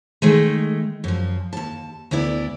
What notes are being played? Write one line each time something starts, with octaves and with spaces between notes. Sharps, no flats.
D#3 G#3 A3
F#2 F3
D#2 A5
D2 B3 E4 D5